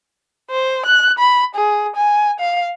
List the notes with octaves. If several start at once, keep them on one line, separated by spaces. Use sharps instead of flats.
C5
F#6
B5
G#4
G#5
F5